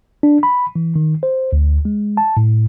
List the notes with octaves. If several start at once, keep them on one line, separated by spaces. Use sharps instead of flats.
D4
B5
E3
D#3
C5
D2
G#3
A5
A2